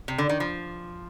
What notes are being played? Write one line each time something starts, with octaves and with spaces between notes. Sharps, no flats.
C3
D3
D#3
F3